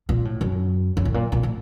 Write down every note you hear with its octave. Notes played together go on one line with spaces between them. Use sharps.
A#2
A2
F#2
F#2
A2
A#2
A#2
A2